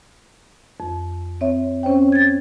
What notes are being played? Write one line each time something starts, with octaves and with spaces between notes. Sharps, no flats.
F2
C4 C#5 E5
C4 C#4 C5 C#5 G5
G#6 A6